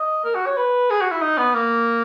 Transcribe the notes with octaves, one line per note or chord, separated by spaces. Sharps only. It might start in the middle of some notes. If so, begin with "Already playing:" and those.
Already playing: D#5
A#4
F#4
C#5
B4
G#4
F#4
E4
D#4
B3
A#3